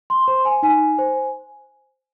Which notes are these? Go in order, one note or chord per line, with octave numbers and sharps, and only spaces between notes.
C6
C5 C6
G#5
D#4 G#5
C5